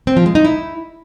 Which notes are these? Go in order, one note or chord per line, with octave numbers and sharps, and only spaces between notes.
C4
F3
G#3
D#4
E4